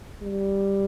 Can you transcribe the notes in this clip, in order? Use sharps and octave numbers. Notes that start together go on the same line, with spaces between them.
G3